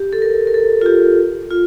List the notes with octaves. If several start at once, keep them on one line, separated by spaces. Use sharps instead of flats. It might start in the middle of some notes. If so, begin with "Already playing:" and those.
Already playing: G4
A4
A#4
A#4
A4
F4
G4
F4